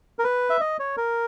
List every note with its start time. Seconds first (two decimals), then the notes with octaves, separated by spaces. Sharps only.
0.19 A#4
0.24 B4
0.50 E5
0.61 D#5
0.79 C#5
0.97 A#4